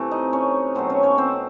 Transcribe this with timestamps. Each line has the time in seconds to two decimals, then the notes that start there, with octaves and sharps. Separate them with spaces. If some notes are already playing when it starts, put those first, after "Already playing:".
Already playing: C3 E3 A3
0.11 D#4 D#5
0.33 C#4 C#5
0.75 B2 F#3 A3 C4 C5
0.89 C#4 C#5
1.03 C#4 C#5
1.18 C4 C5